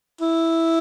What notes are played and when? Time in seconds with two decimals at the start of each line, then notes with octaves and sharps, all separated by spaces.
0.21 E4